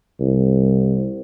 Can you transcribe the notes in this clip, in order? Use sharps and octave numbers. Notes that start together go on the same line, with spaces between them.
C2